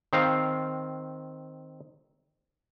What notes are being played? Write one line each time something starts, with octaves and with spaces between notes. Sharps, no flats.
D#3 C4 F5